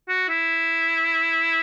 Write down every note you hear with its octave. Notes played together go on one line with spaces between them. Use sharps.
F#4
E4